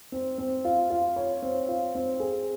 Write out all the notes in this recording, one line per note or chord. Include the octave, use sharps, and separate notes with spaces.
C4
C4
F4
F4
C#5
C4
F4
C4
G#4